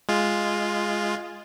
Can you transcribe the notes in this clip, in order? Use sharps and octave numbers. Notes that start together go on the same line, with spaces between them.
G#3 F4